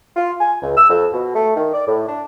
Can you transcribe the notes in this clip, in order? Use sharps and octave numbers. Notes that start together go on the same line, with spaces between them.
F4
G#5
C#2
E6
F2
B2
A3
D#3
D5
A2
D4